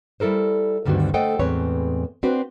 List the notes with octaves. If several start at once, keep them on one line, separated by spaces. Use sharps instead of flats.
G3 E4 A4 A#4 C5
D2 G2 D3 D#3 C4 F#4
A3 A4 C5 D#5 F#5 G5
E2 A2 G#3 C4 B4 C#5
C4 D4 F#4 B4 C5